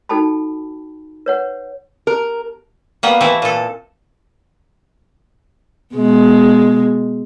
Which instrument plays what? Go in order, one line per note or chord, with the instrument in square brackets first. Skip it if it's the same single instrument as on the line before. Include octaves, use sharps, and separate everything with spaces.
[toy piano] D#4 F#4 A4 G5 A5 B5
B4 C#5 F#5
[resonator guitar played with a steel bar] A#4
[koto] G3 A#3 B3
E3 A3 C4 E4
A#2 A4
[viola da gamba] B2 G#3